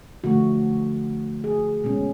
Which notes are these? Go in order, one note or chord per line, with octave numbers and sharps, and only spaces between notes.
D3 F3 A3 F#4
G#4
B2 G#3 C#4